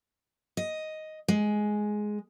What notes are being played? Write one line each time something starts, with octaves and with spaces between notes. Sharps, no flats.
D#5
G#3